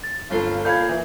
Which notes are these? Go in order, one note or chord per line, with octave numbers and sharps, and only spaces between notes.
A6
G1 F2 F4 A4
A#2 A4 F5 B5 G6 G#6
E3